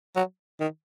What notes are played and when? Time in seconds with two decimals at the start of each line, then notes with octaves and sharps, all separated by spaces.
0.16 F#3
0.60 D#3